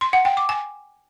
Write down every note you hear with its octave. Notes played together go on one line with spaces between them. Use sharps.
C6
F#5
G5
D6
G#5